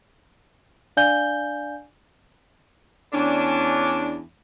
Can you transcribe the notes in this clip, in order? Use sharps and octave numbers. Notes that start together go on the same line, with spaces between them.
D4 D5 F5 G#5 G6 G7
E2 C#4 D4